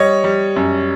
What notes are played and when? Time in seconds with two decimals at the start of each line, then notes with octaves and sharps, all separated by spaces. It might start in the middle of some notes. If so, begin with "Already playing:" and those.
Already playing: G3 C#5 D#5
0.24 G3
0.56 F#2